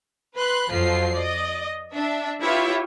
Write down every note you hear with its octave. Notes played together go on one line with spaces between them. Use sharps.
B4 B5 C6 F#6
F2 F3 F#3 F4 C7
D5 D#5
D4 E5
E4 F4 G4 B4 C#5 E5